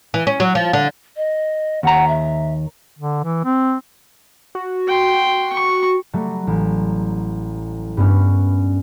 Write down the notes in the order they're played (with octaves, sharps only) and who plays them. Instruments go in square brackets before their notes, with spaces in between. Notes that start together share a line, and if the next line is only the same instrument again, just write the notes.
[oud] E3
C#4
F#3
F3
D3
[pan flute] D#5
[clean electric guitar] D#2 A#5 [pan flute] F#5
[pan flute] E5
[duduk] D3
E3
C4
[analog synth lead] F#4
[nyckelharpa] G5 C6
C#6
[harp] F#3 G3 A3
A1
G2 B3 C#4